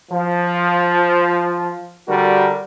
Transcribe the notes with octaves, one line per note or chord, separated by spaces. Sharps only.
F3
D3 G3 D4 F#4 A#4